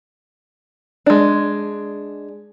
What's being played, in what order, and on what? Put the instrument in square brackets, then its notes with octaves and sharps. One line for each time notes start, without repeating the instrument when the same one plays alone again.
[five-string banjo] G#3 D4